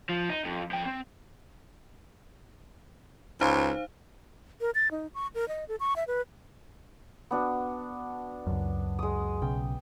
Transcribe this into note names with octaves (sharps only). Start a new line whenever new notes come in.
F3
D#4
F2
F3 G5
C4
C#2 D#4 C5 F5
A#4
A6
D#4
C#6
A#4
D#5
A4
C#6
E5
B4
B3 D4 F#4
C#2 F#2
G#3 D#6
B1 C#3 G5